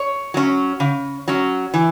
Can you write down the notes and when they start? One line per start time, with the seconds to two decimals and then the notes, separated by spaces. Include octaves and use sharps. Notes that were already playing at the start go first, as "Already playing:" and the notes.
Already playing: C#5
0.34 F#3 C#4
0.80 C#3
1.28 F#3 C#4
1.74 E3